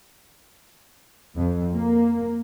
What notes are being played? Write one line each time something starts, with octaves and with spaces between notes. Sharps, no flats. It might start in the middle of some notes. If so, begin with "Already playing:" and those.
F2
A#3